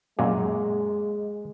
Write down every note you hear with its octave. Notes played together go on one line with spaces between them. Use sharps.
F#2 A#2 F#3 G#3